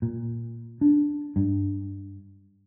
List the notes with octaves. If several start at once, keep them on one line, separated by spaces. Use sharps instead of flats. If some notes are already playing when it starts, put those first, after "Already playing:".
A#2
D4
G2